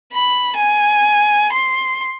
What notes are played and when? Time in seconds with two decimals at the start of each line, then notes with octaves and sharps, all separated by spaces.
0.13 B5
0.56 G#5
1.52 C6